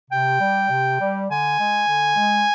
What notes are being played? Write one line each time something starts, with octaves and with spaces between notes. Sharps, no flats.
C3 G5
G3
C3
G3
D3 G#5
G#3
D3
G#3